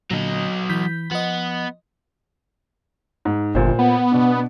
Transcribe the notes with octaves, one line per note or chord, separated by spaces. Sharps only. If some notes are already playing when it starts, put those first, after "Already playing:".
A#2 D3 F#3 D#5
E3 G6 B6
F3 B3 D#5
G#2
G1 A#2 C5
B3
B2 D4